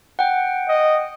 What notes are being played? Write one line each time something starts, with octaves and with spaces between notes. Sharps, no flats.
F#5 G5
D#5